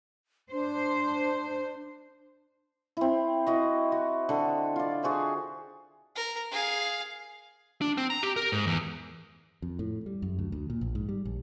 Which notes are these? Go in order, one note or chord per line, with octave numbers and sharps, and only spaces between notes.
D4 C5
C4 E4
E4 F#4 D#5
F#4
D3 A4
F4 D5
F#4 G#4 C5 E5
A#4
G#4 F5
D4
C4
A#5
G4
A#4
G#2
E2
F2
A2
G3
F#2
D2
D2
A#2
A#1
G#2
G3
A#1